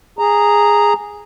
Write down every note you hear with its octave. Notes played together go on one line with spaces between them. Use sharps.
G#4 A#5